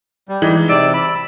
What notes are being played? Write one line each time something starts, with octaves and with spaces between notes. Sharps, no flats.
G3
E3 G#3 D#4
C3 D5 E6 D7
B5 E6